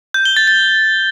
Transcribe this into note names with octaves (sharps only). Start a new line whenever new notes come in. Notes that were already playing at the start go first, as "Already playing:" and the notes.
G6
G7
A6
A6